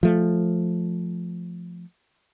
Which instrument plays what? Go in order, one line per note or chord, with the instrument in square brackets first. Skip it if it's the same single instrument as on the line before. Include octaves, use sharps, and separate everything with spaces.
[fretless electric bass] F3 A3